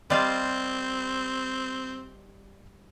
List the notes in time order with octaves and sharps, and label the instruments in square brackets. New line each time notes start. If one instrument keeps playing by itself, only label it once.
[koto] G3 F4 A5 [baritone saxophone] C4 [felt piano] D5 D#5